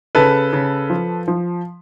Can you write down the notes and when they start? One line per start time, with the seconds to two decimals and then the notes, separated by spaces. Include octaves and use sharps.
0.15 C#3 A4 B4
0.53 C#3
0.90 F3
1.28 F3